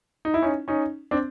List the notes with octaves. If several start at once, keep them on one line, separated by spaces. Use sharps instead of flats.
D#4
E4
C#4 D#4
C#4 D#4
C4 D4